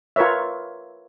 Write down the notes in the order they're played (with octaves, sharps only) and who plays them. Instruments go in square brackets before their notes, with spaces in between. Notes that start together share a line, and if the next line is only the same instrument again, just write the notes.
[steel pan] F4 A#4 B4 C#5 E5